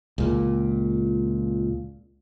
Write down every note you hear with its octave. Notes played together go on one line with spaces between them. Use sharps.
C#2 A#2